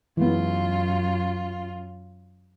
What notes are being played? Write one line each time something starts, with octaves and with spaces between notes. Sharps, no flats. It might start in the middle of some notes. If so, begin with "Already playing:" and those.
F#2 E3 G#3 B3 F4